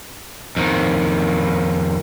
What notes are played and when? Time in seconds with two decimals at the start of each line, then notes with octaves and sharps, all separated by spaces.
0.57 F2 D#3